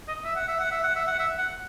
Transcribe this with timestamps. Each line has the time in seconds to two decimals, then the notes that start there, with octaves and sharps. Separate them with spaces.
0.08 D#5
0.24 E5
0.36 F#5
0.48 E5
0.59 F#5
0.71 E5
0.84 F#5
0.96 E5
1.07 F#5
1.19 E5
1.38 F#5